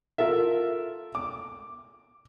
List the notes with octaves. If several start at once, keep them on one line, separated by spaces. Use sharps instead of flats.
F4 A4 A#4 E5
D6